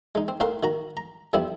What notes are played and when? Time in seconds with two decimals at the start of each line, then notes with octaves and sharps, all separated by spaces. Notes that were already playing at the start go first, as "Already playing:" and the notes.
0.15 G#3 D#4
0.28 C4
0.40 A2 C4 A#4 F5 F#5 C6
0.63 D#3 F#4 A#5
0.97 A#5
1.33 F2 F3 G3 B3 C4 E4